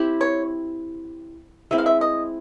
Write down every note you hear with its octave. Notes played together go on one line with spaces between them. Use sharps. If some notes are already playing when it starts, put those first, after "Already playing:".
Already playing: C4 E4 G4
C#5
G#3 C4 E4 E5
F5
E5
D#5